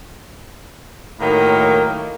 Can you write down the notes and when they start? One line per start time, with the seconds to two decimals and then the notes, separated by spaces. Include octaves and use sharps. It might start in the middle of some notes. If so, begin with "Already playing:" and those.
1.20 A2 D#3 F#3 A#3